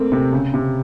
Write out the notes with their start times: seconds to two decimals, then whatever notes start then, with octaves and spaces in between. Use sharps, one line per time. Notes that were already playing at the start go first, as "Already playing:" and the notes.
Already playing: A3 A#3 C4
0.12 C3
0.33 C#3
0.54 C3